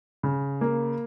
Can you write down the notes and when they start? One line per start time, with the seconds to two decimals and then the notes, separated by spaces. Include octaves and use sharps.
0.23 C#3
0.61 A#3